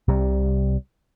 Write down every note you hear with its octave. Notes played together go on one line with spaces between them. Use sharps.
C2 C3 G3